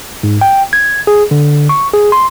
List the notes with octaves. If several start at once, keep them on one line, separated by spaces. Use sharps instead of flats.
G#2
G5
G#6
G#4
D3
C#6
G#4
C6